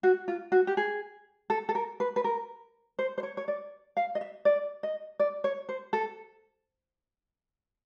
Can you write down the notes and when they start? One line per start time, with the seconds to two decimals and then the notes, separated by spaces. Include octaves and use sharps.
0.03 F#4
0.28 F4
0.52 F#4
0.67 G4
0.77 G#4
1.50 A4
1.69 A4
1.75 A#4
2.00 B4
2.16 B4
2.24 A#4
2.99 C5
3.18 C5
3.23 C#5
3.37 C#5
3.48 D5
3.97 F5
4.15 D#5
4.21 E5
4.45 D5
4.83 D#5
5.20 D5
5.44 C#5
5.69 C5
5.93 A4